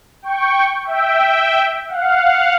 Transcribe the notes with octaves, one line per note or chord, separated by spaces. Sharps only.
G5 C#6
E5 G5
F5 F#5